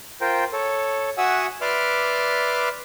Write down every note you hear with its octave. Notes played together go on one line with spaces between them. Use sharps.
F4 A#4 C5 G5
A4 C#5
F#4 E5 F#5 G#5 D#6 E6
B4 D5 E5 C6 D6 F6